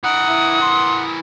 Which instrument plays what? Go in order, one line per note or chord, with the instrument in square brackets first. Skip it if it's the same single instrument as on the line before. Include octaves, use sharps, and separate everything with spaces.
[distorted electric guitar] E3 A#4 [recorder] F#5 [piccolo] D#6
[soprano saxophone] E4
C6